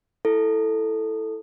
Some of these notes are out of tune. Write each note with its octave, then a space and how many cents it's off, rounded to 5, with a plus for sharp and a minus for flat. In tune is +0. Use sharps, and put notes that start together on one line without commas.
E4 +0 A4 +0